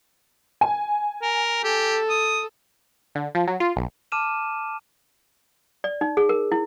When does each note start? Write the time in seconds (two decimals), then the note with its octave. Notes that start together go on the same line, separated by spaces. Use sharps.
0.61 G#5
1.22 A#4
1.64 G4 A4
2.09 D#6
3.15 D3
3.35 F3
3.47 F#3
3.60 F4
3.76 B1
4.12 A5 D6 F6 D#7 E7
5.84 D5
6.01 D#4
6.17 G#4
6.29 A#4
6.52 E4